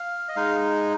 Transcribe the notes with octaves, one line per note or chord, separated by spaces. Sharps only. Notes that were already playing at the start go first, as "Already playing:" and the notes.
Already playing: F5
D#5
G#3 D#4 F5